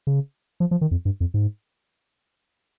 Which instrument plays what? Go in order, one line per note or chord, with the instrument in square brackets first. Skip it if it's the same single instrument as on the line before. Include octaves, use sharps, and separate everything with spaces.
[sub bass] C#3
F3
F3
D#3
F2
G2
F2
G#2